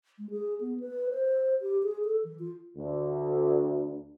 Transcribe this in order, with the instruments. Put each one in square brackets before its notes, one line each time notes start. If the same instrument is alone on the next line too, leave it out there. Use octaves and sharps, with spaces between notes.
[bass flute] G#3
G#4
B3
B4
C5
G4
G#4
A4
E3
F4
[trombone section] D2